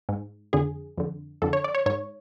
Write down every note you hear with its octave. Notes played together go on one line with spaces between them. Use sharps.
G#2
F2 D3 G#4
F2 D3
F2 D3 A4
C#5
D5
C#5
G#2 C#5